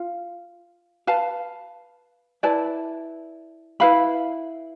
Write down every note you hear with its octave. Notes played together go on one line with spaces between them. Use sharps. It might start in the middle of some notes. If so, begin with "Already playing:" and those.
Already playing: F4 F5
B4 F5 A5
E4 B4 D5 A5
E4 B4 F5 B5